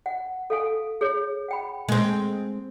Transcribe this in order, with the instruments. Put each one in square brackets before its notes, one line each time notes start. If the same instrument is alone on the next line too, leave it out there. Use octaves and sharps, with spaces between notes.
[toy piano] F#5
A4 F5 G#5
G#4 C#5
F#5 G5 B5
[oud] G#3 C4